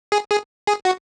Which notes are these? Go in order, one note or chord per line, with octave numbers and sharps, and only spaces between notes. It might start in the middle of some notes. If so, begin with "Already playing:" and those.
G#4
G#4
G#4
F#4